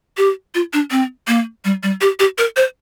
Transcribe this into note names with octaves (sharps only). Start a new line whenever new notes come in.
G4
F4
D4
C4
A#3
G3
G3
G4
G4
A#4
C5